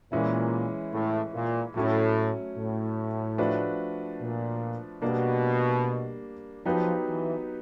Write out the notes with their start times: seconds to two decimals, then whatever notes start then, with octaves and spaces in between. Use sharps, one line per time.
0.12 A#2 E3 G#3 C#4 E4
0.93 A2
1.34 A#2
1.75 A2 F#3 A3 C#4
2.57 A2
3.38 F3 A3 D4 F#4 B4
4.20 A#2
5.02 B2 G3 A#3 D4
6.66 F3 F#3 B3 D#4 G4 B4
7.06 E3